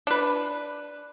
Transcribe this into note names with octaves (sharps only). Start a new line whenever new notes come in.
D4 B4